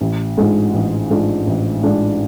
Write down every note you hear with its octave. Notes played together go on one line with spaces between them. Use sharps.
A1
G#2 G#3 D4 F4
A1
G#2 G#3 D4 F4
A1
G#2 G#3 D4 F4